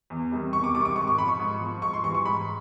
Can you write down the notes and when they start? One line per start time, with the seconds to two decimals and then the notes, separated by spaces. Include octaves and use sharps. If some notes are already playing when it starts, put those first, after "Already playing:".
0.10 E2
0.32 C3 D#3 G3
0.53 E2 C#6
0.64 D6
0.75 C3 D#3 G3 D6
0.81 C#6
0.85 D6
0.96 G#2 C#6
1.08 C#6
1.18 F3 B5
1.28 C#6
1.39 G#2
1.61 F3
1.82 G#2 C#6
1.93 C6
2.03 E3 G3 C#6
2.15 C#6
2.25 G#2 B5